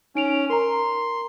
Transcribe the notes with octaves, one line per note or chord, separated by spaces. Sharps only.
C#4 D#4 D7 F7
A#4 A#5 C6